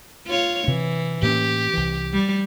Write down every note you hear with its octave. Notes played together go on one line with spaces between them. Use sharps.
F4 C#5
C3 E3
A2 A#3 C#4 G4
C2 E3
G3